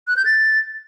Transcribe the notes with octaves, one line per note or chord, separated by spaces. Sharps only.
F#6
G6
A6